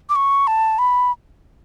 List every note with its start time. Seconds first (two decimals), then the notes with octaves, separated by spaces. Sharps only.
0.09 D6
0.16 C#6
0.47 A5
0.79 B5